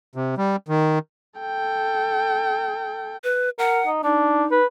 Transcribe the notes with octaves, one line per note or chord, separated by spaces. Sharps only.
C3
G3
D#3
A4 G5
B4
A#4 F#5
D#4
D4 D#4
B4